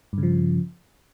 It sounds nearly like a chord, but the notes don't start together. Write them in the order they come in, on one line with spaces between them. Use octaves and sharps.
G2 C#3 F3